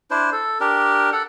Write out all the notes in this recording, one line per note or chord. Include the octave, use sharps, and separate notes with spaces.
D4 E4 C5
A4
D4 G4 A#4
A4 F#5